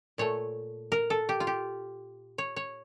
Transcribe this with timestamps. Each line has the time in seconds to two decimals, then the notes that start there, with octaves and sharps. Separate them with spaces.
0.18 A#2 A3 C#5
0.92 A#4
1.10 A4
1.29 G4
1.40 F4
1.47 G4
2.38 C#5
2.56 C#5